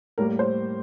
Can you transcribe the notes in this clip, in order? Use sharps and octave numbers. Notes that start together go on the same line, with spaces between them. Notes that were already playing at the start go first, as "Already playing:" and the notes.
A2 G3 A#3 A#4
C5